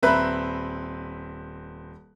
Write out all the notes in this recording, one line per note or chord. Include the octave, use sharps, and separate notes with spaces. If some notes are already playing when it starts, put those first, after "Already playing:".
D#1 C4 B4 E5 A#5 F#6